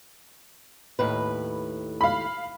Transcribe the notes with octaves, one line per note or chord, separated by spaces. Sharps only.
D#2 A2 B4
F5 B5